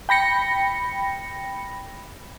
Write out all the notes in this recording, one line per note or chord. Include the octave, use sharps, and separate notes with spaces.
G5 B5 A#6 C#7